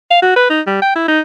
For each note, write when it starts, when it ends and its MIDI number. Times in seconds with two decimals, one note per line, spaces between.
0.11 0.19 77
0.22 0.35 66
0.36 0.44 71
0.50 0.61 63
0.67 0.80 55
0.82 0.90 79
0.95 1.04 64
1.08 1.20 63